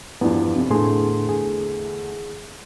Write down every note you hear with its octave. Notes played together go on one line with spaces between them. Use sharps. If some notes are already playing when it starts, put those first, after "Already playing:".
E2 G2 F3 B3 D4
F2 C3
E2 A2 D3 A3 G#4 C6
G#4